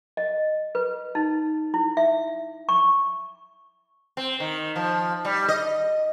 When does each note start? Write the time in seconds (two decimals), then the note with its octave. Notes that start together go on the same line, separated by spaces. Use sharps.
0.17 D#5
0.75 B4
1.15 D#4
1.74 E4
1.97 E5
2.69 C#6
4.17 C4
4.40 D#3
4.76 F3
5.25 G3
5.49 D#5